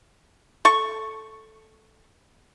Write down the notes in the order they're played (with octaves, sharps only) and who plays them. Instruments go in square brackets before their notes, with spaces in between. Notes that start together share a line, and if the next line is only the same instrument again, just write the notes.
[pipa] A4 C#6